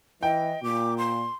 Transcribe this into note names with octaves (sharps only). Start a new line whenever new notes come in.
E3 D#5 G5
A#2 D6
C6